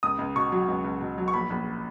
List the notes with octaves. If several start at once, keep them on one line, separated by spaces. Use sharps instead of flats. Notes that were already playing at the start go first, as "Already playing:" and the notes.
C#2 D#6
C#2
B2 C#6
F#3
C#2
C#2
B2
F#3
C#6
A#1 B5
A#1